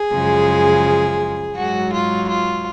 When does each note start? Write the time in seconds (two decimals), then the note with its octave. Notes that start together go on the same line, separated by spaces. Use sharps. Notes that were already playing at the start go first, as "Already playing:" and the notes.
Already playing: G#4
0.12 F#2 C#3 F3 G#3
1.57 G#2 F#3 F#4
1.93 F4
2.29 F4